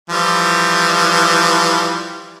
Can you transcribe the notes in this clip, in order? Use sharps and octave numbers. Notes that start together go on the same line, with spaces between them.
E3 F3 G3